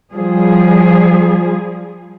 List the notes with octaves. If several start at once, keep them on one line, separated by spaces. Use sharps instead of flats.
F3 G3 G#4